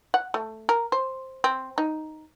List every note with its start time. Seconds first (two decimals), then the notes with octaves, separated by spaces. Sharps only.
0.14 F#5
0.34 A3
0.69 A#4
0.92 C5
1.44 C4
1.78 D#4